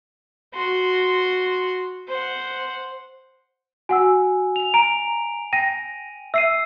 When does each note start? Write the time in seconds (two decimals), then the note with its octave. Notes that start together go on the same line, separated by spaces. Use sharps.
0.54 F#4 C6
2.08 C5 F#5
3.89 F#4 F#5 G#5 E6
4.56 F7
4.74 A#5 D7
5.53 G5 A#6 D#7
6.34 E5 E6 C7 D#7